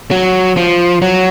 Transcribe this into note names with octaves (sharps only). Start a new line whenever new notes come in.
F#3
F3
F#3